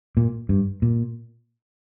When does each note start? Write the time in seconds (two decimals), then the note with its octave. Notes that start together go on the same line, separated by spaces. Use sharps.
0.17 A#2
0.49 G2
0.82 A#2